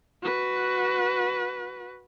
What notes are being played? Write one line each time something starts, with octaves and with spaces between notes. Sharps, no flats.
F#4 B4